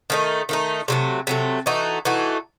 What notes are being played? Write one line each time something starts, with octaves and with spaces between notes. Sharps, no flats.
D#3 A3 D#4
D#3 A3 D#4
C3 F#3 A3
C3 F#3 A3
E3 A3 D#4 F#4
E3 A3 D#4 F#4